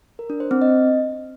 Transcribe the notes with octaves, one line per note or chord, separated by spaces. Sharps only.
A#4
D4
C5
C4
D#5